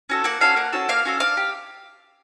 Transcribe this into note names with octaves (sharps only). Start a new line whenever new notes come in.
C#4 F#4 A4
A#3 F#5
C#4 F#4 A4 F5
A#3 F#5
C#4 F#4 A4
A#3 F5
C#4 F#4 A4
D4 F5
G4